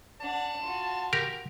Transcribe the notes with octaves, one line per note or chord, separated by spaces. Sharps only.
D4 F#5 A5
F4 F#4
G4 A#4